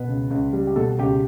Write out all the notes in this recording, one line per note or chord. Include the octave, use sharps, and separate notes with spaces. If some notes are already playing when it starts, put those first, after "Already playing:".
Already playing: B2 B4
C#2
C#2
G3
G4
B2 A4
C#2 G4